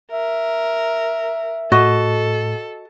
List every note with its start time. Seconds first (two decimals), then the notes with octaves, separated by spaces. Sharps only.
0.12 A#4 E5
1.72 A2 F#4 A4 D#5